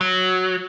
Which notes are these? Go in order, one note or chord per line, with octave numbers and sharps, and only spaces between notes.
F#3